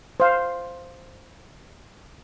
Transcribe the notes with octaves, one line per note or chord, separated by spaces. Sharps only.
C5 F5